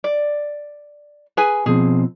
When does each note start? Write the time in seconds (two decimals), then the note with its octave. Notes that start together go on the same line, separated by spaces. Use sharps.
0.04 D5
1.37 G#4 B4 G#5
1.66 B2 F3 C4 G#4